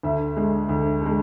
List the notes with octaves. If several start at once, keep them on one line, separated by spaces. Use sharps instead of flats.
D2 E5
D3 G#3
D2
D3 G#3